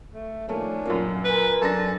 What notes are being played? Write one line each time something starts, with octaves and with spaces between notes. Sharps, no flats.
A3
D#3 F3 A3 A#3 C#4 D4
F#2 A#2 A#3
A#4 B4 G#5
F#2 D4 A4 A#6